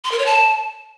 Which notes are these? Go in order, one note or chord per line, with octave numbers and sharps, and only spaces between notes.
C6
A#4
C#5
A5